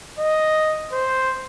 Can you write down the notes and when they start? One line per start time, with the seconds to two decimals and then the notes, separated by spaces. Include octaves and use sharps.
0.19 D#5
0.92 C5